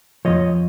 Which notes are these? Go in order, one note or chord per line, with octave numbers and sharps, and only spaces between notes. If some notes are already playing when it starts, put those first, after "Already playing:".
F2 C#3 F3 C#5 D#5